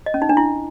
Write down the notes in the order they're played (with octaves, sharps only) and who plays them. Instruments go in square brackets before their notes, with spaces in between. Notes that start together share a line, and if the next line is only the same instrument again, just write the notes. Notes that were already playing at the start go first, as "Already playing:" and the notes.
[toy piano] D#5
C#4
D#4
D4
E4